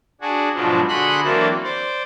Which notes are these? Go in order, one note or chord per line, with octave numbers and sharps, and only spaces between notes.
D4 F#4 G#4
G#2 B2 F3 F#3 D4
D3 F#4 G#4 B5 C6 F#6
E3 F#3 A#3 C4 D4 A4
C5 D5